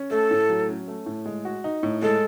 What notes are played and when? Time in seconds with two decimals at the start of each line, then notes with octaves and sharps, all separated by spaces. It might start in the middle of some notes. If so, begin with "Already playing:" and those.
Already playing: C#4
0.10 A3 A4
0.31 A2
0.50 F#3
0.68 C#4
0.88 A3
1.06 A2
1.26 G#3
1.45 F#4
1.64 D#4
1.83 A2
2.02 G#3 A4